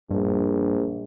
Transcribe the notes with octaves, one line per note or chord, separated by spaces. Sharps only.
A#1 G2